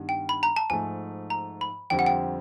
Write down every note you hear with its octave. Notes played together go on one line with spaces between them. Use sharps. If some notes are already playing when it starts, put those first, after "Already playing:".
Already playing: G2 D#3 G3 B3
G5
B5
A#5
A5
G#2 F3 A3 G#5
A#5
B5
F2 D3 G3 C4 G5
F#5
G5